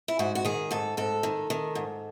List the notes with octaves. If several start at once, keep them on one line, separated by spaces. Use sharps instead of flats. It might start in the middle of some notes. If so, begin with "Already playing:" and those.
E4
G#2 F#4
F#4
D#3 G#4
G#2 A4
G#2 A4
D#3
D#3
G#2